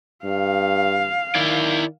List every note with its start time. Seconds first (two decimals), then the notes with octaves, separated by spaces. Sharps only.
0.25 G2 F5
1.35 D#3 E4 D5